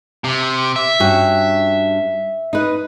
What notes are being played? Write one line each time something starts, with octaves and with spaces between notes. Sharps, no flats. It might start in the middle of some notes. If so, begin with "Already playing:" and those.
C3
E5
G2 C#4 F#4
D#4 B4